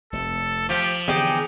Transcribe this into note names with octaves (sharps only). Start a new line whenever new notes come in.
F1 C3 A3 A4
F3 G4
D3 E3 B3 D#4 G4 G#4